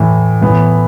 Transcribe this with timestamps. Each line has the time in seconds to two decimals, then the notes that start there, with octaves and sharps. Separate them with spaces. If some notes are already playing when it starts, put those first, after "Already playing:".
Already playing: A2 E3
0.42 A2 E3 B3